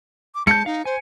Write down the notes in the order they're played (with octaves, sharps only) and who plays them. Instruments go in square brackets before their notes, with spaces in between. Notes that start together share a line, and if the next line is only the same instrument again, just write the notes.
[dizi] D6
[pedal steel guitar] G#3 G6 [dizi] A5 [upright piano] C#7
[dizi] D#4 [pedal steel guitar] F5
[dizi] C5 [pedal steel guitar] G#5